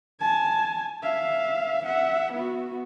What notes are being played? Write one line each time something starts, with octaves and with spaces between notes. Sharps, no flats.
G#5 A5
E5 F5
E5 F#5
B3 F#4